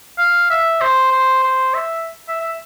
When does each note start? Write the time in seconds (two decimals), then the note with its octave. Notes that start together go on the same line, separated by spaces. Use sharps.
0.18 F5
0.50 E5
0.81 C5
1.12 C5
1.43 C5
1.74 E5
2.28 E5
2.41 E5